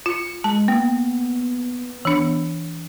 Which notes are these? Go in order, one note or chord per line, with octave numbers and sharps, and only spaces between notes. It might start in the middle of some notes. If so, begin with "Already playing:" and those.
F4 C#7
G#3 A5
A#3 B3
E3 D4